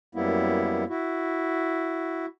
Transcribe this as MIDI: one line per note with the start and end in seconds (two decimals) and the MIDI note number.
0.15 0.84 42
0.15 0.84 55
0.15 0.84 58
0.15 0.84 59
0.15 0.84 64
0.89 2.26 64
0.89 2.26 66